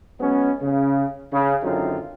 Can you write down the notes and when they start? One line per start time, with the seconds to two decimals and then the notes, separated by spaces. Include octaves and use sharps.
0.19 F#3 G#3 B3 C#4
0.61 C#3
1.31 C#3
1.63 G#1 F#2 D3 C4 D#4 F4